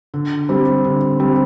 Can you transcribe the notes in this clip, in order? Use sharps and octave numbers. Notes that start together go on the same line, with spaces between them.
D3
G3 C4
D3
G3 C4